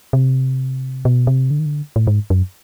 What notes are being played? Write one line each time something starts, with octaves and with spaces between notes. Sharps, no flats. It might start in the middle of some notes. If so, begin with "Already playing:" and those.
C3
B2
C3
D3
D#3
D3
A2
G#2
F#2